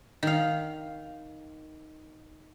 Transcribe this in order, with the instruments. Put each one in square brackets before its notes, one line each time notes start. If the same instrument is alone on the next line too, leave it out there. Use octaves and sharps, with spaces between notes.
[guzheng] D#3 F5